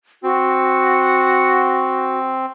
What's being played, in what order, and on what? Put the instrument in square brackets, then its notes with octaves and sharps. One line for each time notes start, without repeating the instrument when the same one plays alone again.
[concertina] C4 [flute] F#4